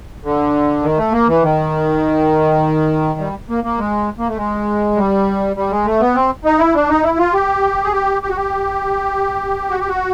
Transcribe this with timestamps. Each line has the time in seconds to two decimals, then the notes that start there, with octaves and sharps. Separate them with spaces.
0.24 D3
0.83 D#3
0.98 A3
1.12 A#3
1.28 E3
1.43 D#3
3.19 G3
3.49 A#3
3.64 A#3
3.79 G#3
4.19 A#3
4.28 A3
4.37 G#3
4.96 G3
5.56 G3
5.71 G#3
5.86 A3
6.01 B3
6.15 C4
6.45 D#4
6.59 E4
6.74 D4
6.89 D#4
7.03 E4
7.18 F4
7.33 G4
7.84 G#4
7.92 G4
8.22 G4
8.29 F#4
8.37 G4
9.70 F#4
9.80 G4
9.88 F#4